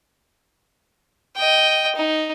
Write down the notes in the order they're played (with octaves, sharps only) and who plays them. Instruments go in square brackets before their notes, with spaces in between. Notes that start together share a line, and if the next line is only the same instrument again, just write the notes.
[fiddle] D#5 G5
D#4